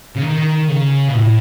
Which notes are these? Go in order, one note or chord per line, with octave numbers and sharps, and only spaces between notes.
C#3
D#3
C#3
B2
A2